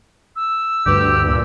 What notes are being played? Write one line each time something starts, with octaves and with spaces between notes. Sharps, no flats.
E6
D2 G2 G4 B4
A#2